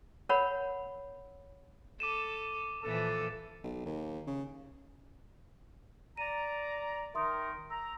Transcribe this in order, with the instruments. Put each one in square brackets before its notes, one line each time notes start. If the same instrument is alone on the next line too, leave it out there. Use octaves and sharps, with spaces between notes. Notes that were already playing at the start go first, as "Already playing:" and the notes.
[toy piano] A#4 C#5 F#5 B5
[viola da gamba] A4 [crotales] D6 D#7 E7
[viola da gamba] A#2 E3 F3 [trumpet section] A4
[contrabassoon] B1
D#2
C#3
[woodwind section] D5 A#5 [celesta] D#7
[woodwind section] D#3 D#4 A#4 [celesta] E5 C6 D#6
[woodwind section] A#5 [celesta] E6